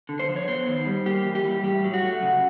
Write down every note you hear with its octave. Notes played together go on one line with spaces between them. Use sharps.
D3
C5
F3
C#5
B3 C5
D#3
G3
A#3 G4
E3
G4
G3
A2 G4
F#3
F#4
A3
C#3